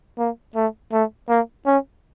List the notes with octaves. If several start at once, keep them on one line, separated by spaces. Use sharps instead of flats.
A#3
A3
A3
A#3
C#4